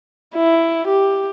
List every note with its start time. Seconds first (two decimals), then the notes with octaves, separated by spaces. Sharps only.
0.35 E4
0.87 G4